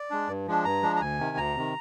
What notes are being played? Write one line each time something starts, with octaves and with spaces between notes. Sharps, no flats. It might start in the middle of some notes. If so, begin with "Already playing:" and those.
Already playing: D5
G#3 D4
G2
F3 G#3 D4
G2 A#5
F3 G#3 D4
A#5
D2 G#5
C3 D#3
D2 A#5
C3 D#3